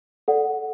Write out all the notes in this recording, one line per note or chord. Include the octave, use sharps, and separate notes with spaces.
A4 D5 F#5